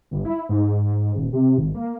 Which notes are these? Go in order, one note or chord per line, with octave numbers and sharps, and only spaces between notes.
G1
E4
G#2
D#1
C3
G#1
A#3